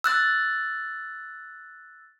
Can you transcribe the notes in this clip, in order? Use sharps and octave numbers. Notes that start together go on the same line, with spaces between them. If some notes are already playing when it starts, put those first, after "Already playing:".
E6 F#6 A6